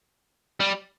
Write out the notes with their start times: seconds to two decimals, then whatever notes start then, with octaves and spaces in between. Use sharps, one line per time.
0.60 G3